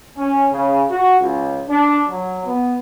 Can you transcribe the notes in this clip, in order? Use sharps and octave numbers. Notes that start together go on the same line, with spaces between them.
C#4
C#3
F#4
C#2
D4
F#3
B3